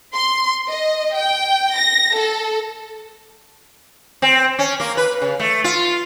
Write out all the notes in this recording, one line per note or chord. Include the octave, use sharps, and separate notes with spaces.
C6
D#5
G5
A#6
A4
C4
C#4
A#3
B4
C#3
A3
F4